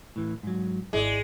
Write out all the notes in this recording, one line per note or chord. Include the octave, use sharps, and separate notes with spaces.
A2 E3
G#2 F#3
G#1 G#3 E4 D5